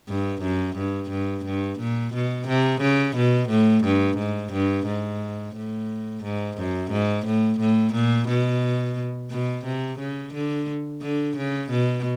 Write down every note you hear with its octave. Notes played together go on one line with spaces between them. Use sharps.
G2
F#2
G2
G2
G2
A#2
B2
C3
C#3
B2
A2
G2
G#2
G2
G#2
A2
G#2
F#2
G#2
A2
A2
A#2
B2
B2
C3
C#3
D3
D3
C#3
B2